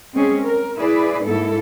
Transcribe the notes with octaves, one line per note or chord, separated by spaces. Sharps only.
G#3 C4 C#4 G#4
A#4
E4 G#4 B4 D5
G#2 A#3 E4 A4